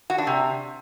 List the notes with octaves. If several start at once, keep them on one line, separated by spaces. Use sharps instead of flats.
F#4
D4
C3